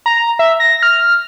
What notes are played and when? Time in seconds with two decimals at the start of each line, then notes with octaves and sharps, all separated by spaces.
0.06 A#5
0.39 E5
0.60 A#6
0.83 F6